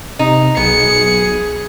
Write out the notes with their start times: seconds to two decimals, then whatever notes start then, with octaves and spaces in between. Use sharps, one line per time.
0.19 C3 D#4
0.57 B1 B3 G#4 C#7